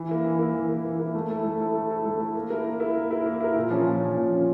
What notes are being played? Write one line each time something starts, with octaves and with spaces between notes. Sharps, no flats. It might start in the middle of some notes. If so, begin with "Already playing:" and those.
Already playing: E3
A#3 E4
E3
A#3 E4
E3
A#3 E4
E3
A#3 E4
A3
E4 A4
A3
E4 A4
A3
E4 A4
A3
E4 A4
A#3
E4 A#4
A#3
E4 A#4
A#3
E4 A#4
A#3
E4 A#4
A#2
F3 C#4
A#2
F3 C#4
A#2
F3 C#4